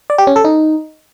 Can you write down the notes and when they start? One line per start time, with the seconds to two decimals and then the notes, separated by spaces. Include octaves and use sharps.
0.10 D5
0.18 G4
0.27 C#4
0.36 A4
0.45 D#4